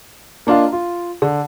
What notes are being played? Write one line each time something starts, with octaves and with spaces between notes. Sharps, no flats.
A#3 D4 F4 D#5 F5
F4
D3